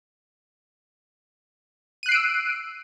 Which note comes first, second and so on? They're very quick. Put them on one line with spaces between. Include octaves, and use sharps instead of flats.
D#7 F#6 C7 D7 E6